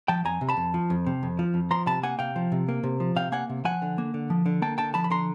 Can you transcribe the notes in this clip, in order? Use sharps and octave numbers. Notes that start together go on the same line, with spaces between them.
F3 G5 A5
F2 G#5 A#5
C3
A5 B5
F2
F3
F2
C3
F2
F3
F2
F3 A#5 C6
C3 A5 B5
A#3 F#5 G#5
C3 F5 G5
F3
C3
A#3
C3
F3
C3 F5 G5
A#3 F#5 G#5
C3
F3 F#5 G#5
D3
A#3
D3
F3
D3
A#3 G5 A5
D3 G5 A5
F3 A5 B5
B5
D3 A#5 C6